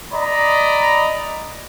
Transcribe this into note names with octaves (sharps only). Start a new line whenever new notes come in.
D5 D#5 A#5 B5